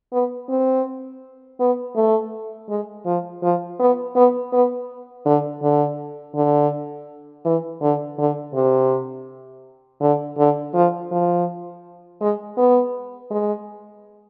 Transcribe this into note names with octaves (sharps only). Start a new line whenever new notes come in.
B3
C4
B3
A3
G#3
F3
F3
B3
B3
B3
D3
D3
D3
E3
D3
D3
C3
D3
D3
F3
F3
G#3
B3
G#3